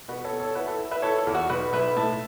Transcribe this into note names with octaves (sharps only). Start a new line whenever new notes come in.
B2 F#4 B4
A4 C#5
B3
A4 C#5
E4 F#4 B4
A4
E4
B4 E5
E4 A4 C#5
A4
E2
F#4
B1 F#4 B4
B1 B4 E5
A2 E5 A5